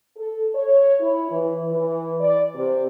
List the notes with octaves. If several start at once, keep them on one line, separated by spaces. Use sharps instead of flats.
A4
C#5
E4
E3
E3
D5
C3